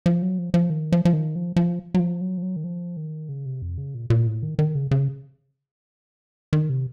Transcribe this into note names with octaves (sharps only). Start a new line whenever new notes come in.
F3
F#3
F3
F3
D#3
F3
F3
D#3
F3
F3
F#3
F3
F#3
F3
F#3
D#3
F3
D#3
C#3
C3
F2
C#3
A#2
A#2
A2
D#3
D#3
C#3
C#3
D#3
C3